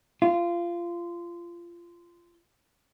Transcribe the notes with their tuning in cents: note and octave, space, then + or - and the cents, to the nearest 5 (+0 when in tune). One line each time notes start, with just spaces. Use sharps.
F4 -20